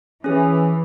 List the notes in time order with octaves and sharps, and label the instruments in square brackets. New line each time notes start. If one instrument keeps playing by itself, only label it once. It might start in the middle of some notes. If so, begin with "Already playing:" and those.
[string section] E3 [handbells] C#4 G#4